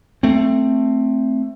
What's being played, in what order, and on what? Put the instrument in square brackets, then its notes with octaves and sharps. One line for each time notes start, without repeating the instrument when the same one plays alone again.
[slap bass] A3 C4